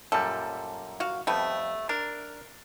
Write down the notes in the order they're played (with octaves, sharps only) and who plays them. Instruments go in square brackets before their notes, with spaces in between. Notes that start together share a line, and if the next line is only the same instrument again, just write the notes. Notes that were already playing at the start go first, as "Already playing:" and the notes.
[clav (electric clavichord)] F#2 A#2 G3 [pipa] A4
[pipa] F#4 F5
[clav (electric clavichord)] F2 [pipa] G3 A3 B3
[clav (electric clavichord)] D4 [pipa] A#4